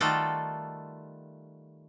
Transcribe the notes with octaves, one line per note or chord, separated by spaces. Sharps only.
D#3 G3 A3 F4 F#4 A4